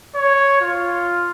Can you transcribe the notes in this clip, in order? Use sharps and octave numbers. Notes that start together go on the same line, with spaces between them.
C#5
F4